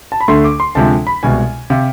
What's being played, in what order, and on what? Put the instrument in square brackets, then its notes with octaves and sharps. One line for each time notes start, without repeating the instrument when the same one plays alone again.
[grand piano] A5
B5
D2 D3 A3 C6
D6
C6
D2 C3 F3 G#3 A5
B5
C2 B2 G#3 G#5
C3 F5